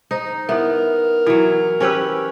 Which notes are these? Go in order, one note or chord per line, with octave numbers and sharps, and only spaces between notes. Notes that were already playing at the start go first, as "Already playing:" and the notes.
D#4 C5
B3 E4 A#4 E5
E3 F#3 E4
C#4 G4 B4 C5 G#5 E6